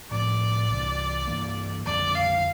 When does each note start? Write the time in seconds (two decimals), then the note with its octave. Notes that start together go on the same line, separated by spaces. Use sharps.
0.11 A2 F3 C4 D5
0.69 C2 C3 E3
1.27 G2 E3 A#3
1.85 F2 D3 G3 C4 D5
2.15 F5